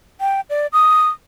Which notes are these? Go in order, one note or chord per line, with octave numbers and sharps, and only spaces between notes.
G5
D5
D#6